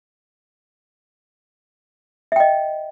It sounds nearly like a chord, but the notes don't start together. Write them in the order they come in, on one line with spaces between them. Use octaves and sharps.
E5 G5 D#5